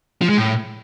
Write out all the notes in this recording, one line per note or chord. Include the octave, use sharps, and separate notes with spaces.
F3
G#3
A2